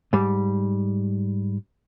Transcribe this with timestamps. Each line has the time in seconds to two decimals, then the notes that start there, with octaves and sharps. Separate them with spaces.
0.13 G#2 G3